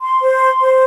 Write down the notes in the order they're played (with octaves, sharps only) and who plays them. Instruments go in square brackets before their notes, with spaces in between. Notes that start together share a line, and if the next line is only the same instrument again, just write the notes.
[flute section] C6
C5
C6
C5